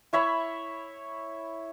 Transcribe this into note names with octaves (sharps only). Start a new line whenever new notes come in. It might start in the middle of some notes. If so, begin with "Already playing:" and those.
E4 C#5 E5 B5